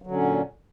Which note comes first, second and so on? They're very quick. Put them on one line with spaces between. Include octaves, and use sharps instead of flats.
F#3 D3 C#4 A#2